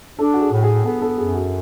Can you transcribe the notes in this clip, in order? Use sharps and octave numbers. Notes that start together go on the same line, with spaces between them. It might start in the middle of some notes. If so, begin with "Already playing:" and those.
D4 A4
F#4
G#4
A2
G#4
B3 A4
A4
F#2 G#4
F#4